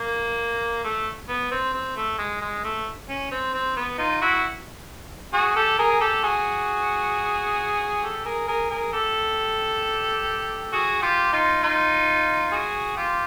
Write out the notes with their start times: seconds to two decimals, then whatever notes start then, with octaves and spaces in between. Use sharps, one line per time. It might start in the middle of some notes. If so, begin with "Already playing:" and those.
Already playing: A#3
0.84 A3
1.29 B3
1.52 C4
1.74 C4
1.96 A3
2.19 G#3
2.41 G#3
2.64 A3
3.09 C#4
3.31 C4
3.54 C4
3.76 B3
3.98 D#4 F4
4.21 E4 F#4
5.33 F#4 G#4
5.56 G4 A4
5.78 G#4 A#4
6.00 G4 A4
6.23 F#4 G#4
8.03 G4 A4
8.25 G#4 A#4
8.48 G#4 A#4
8.70 G#4 A#4
8.93 G4 A4
10.73 F#4 G#4
11.02 F4 G4
11.32 D#4 F4
11.63 D#4 F4
12.52 F#4 G#4
12.97 F4 G4